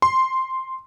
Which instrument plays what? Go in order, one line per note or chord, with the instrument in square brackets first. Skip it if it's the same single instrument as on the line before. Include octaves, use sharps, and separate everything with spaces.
[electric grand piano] C6